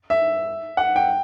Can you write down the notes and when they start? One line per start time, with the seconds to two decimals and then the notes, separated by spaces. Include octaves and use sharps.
0.10 E5
0.77 F#5
0.96 G5